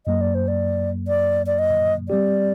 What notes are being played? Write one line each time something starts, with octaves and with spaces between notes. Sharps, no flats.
F#2 F#3 A#3 D#5
D5
C5
D5
D5
D5
D#5
G3 C4 G4 D5